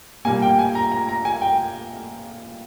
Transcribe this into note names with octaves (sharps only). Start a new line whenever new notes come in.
A#2 G3 A#3 G#5
G5
G#5
A#5
A#5
A#5
G#5
G5